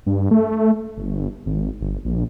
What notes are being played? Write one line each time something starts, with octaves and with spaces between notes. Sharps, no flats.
G2
A3
G1
G#1
G1
A#1